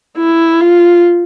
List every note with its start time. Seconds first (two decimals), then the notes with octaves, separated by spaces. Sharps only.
0.18 E4
0.61 F4